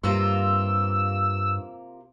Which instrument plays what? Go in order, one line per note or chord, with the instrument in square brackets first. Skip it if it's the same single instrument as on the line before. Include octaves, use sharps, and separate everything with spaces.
[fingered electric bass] G2 [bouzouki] C3 A#3 F4 [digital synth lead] E6